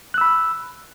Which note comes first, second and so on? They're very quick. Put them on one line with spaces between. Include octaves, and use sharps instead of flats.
F#6 E6 B5